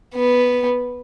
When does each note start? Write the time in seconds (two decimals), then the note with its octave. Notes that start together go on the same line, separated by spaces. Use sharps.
0.14 B3